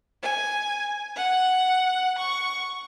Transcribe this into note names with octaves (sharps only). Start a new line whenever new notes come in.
G#5
F#5
C#6